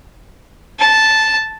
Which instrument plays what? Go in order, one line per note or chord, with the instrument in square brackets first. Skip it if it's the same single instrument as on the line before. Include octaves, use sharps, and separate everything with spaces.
[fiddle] A5